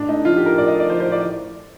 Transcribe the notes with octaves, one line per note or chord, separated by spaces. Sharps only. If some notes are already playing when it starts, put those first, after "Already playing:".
Already playing: A1 D4
A3 D#4
F3 F4
G4
A2 A#4
A1 D5
D#5
A3
D5
F3 C5
C5
A2
D5